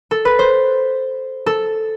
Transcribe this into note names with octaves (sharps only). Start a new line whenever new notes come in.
A4
B4
C5
A4